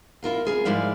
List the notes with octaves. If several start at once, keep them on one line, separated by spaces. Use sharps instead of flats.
E4 F4 A#4 F5
C4 G#4 A#4
G#2 F3 G#3 E4 D5 F5